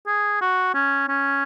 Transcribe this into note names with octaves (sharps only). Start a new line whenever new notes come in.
G#4
F#4
C#4
C#4